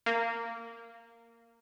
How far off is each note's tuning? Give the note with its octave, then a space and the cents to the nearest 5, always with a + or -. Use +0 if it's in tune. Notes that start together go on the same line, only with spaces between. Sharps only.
A#3 -15